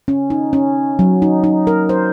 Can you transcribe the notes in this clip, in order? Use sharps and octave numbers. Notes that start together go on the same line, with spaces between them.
C#4
D#4
C#4
F#3
D#4
D#4
A#4
C5